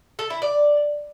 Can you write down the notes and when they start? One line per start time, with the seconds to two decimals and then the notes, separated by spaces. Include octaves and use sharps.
0.19 A4
0.30 E4
0.42 D5